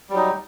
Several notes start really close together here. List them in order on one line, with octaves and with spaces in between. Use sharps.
G3 F#3 D#4